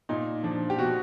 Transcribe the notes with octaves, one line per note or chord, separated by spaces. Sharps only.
A#2 D#4
F3 D4
G4
B2 F#4